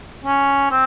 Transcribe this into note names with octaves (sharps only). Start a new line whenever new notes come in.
C#4
C4